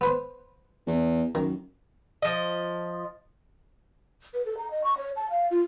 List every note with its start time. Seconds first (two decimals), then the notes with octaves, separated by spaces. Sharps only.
0.01 B3 B4 C5
0.87 E2
1.35 F#2 D#3
2.22 F3 D#5
4.34 B4
4.46 A4
4.58 A#5
4.71 D#5
4.84 C#6
4.98 C#5
5.16 A5
5.30 F5
5.51 F4